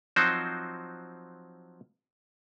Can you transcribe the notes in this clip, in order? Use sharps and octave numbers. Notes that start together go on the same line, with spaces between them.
F3 F#3 C4 D#4 F#4 C5